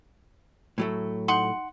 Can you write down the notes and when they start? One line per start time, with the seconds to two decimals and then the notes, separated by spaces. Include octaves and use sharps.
0.78 A2 F#3 A3
1.28 D#4 F#5 C6